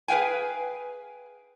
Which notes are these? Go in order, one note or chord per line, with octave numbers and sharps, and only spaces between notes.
G#4 B4 E5 F5 G5 G#5